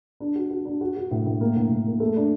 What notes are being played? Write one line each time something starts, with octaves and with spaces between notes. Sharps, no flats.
D4
F#4
F#4
D4
F#4
F#4
A2
A2
A#3
A2
A2
A#3
A3
D4